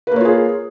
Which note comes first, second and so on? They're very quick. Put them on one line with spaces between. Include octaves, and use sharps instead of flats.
B4 A#3 C#5 F4 G#4